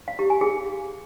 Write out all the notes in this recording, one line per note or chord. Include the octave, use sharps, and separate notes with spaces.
F5
G4
G#5
G#4